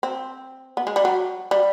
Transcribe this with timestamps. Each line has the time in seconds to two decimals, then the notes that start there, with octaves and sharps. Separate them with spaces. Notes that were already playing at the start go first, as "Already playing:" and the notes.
0.03 C4
0.77 B3
0.87 G#3
0.96 G3
1.05 F#3
1.51 G3